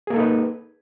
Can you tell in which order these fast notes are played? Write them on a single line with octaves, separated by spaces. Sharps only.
G#4 A#3 A4 D#4 B4